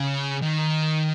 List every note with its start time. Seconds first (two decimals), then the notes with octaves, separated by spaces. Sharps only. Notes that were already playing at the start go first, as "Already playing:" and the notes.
Already playing: C#3
0.42 D#3